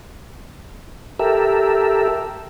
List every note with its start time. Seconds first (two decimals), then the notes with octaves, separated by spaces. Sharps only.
1.19 G4 A4 A#4 E5